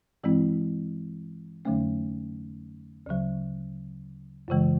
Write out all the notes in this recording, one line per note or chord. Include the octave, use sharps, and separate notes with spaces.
G2 E3 G#3 C4 E4
F2 D3 F#3 A3 C#4
D2 C#3 F#3
F#2 C#3 E3 G#3